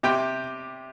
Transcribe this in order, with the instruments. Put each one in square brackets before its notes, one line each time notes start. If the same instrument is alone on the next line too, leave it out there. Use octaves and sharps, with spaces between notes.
[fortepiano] C3 G4 G5